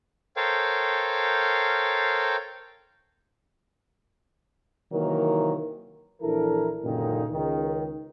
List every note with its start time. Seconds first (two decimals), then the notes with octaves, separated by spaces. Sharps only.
0.36 A4 A#4 C5 C#5 F5 G5
4.93 C3 D#3 E3 F#3 A#3 A#4
6.22 A#1 E3 E4 A4 A#4
6.84 C#2 F#2 A#2 D3 D#3 D#4
7.33 C#2 D#3